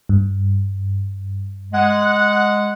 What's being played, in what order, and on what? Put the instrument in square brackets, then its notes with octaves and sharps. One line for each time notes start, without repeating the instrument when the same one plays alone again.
[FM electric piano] G2
[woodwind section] G#3 F#5